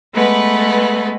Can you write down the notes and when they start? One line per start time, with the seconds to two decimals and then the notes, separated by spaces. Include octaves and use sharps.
0.15 G#3 A3 B3 B4